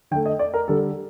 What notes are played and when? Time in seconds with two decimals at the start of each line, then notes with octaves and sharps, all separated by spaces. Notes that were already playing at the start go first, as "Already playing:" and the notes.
0.11 D3 G5
0.15 A3
0.26 D#5
0.39 D5
0.54 A#4
0.68 D3 G3 A4